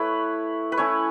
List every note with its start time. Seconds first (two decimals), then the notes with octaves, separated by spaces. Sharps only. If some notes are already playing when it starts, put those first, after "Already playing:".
Already playing: A3 E4 B4 C#5
0.72 B4
0.77 A3 C#4 E4 C#5